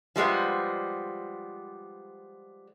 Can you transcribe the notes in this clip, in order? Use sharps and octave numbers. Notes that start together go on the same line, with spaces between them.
F3 G3 G#3 B3